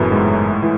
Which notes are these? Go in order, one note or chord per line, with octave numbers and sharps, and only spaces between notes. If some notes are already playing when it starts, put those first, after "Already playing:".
Already playing: F#1 F#2 A2 E3 A3 B3
G#2 G#3
E3